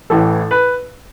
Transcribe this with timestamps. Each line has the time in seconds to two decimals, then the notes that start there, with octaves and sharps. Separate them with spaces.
0.10 A1 A2 E3 A4
0.51 B4